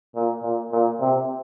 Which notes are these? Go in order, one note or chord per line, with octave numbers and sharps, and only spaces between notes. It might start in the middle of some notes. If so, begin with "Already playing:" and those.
A#2
A#2
A#2
C3